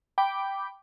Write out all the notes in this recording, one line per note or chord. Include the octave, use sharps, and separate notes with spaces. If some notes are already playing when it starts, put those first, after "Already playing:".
G5 B5 D6